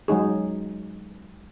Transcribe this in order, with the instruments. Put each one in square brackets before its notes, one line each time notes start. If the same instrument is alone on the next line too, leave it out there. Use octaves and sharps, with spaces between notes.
[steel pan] F#3 G#3 D#4 G#4